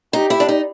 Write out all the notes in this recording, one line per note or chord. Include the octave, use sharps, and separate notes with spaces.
D#4 G4
E4
D4
D#4